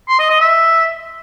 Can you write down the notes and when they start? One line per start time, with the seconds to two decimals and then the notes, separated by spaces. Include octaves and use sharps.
0.08 C6
0.19 D#5
0.30 D#5
0.41 E5